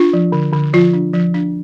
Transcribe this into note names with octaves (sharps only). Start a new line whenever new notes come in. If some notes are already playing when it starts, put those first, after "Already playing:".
Already playing: D4 F4
F3
D3
D3
F3 F4
D4
F3
D4